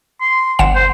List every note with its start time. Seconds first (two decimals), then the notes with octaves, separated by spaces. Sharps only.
0.21 C6
0.59 G1 F#5 E7
0.75 C5